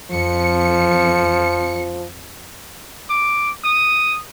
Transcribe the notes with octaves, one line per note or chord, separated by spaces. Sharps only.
F2 F3 C#7
D6
D#6